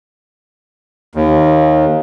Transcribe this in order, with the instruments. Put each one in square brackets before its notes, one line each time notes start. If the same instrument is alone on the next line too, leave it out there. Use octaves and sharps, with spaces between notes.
[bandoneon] D#2